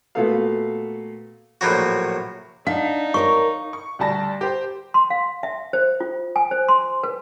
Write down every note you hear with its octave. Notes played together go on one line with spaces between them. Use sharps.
A#2 A3 B3 F#4 A4 F5
A#1 A2 F#3 F#4
D4 D#4 F5 F#5
A#4 C5 C#5 C#6
C#6
D2 G3 A5 A#6
G4 C5
C6
F5
E5
C5
F4
G#5
C5
C6
B4